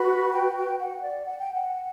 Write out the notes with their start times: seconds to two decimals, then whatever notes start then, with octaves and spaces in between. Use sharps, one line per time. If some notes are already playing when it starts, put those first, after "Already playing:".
Already playing: F#4 B4 B5
0.33 G5
0.56 G5
0.79 F#5
1.01 D5
1.24 F#5
1.38 G5
1.52 F#5